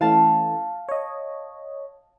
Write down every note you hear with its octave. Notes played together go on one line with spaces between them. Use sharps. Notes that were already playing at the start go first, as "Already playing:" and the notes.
E3 A3 C#4 F5 A5
C#5 D#5